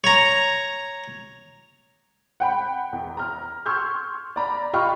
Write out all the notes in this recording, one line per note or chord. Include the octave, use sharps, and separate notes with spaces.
C#5 A#5
F#5 G5 B5
E2
A#5 F6
C6 C#6 E6 F6 G6 G#6
D5 A#5 B5
F4 G4 D#5 B5 C#6 F6